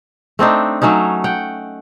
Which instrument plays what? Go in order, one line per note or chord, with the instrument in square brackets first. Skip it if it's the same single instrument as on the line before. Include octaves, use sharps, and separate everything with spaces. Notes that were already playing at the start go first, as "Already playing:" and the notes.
[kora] A3 C4 D4 D#4
F#3 A3 C#4 D#4
F#5 G5